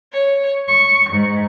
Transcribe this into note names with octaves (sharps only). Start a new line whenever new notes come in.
C#5
C#6
G#2